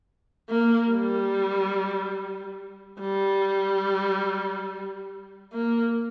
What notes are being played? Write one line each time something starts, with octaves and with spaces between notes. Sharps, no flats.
A#3
G3
G3
A#3